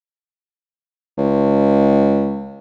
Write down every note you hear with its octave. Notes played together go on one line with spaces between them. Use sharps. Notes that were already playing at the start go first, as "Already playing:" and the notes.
C#2